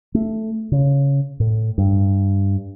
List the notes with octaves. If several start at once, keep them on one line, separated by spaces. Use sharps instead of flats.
A3
C#3
A2
G2